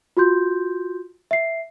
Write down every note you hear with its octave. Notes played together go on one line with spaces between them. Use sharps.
F4 F#4 C6 G6
E5 C7